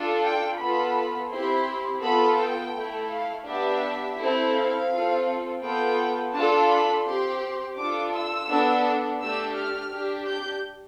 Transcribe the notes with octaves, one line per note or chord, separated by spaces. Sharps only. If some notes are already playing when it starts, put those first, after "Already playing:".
Already playing: D4 F4 A4
G5
B3 F4 A4 B5
C4 E4 G4 C6
B3 F4 A4 B5
G5
A3 E4 A4
F5
B3 D4 G4 E5
C4 E4 A4
F5
C4 F4 A4
B3 F4 A4 G5
D4 F4 A4 A5
B5
C4 G4 C6
D4 F4 A4 D6
E6
B3 D4 A4
A3 D4 G4 E6
F6
D4 G4
G6